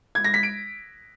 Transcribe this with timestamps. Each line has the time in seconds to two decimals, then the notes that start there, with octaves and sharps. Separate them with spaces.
0.15 G#6
0.24 A#6
0.34 B6
0.43 D7